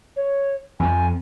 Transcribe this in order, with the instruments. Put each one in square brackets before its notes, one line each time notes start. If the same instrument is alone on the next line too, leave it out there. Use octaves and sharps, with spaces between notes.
[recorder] C#5
[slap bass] F2 F3 [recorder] G#5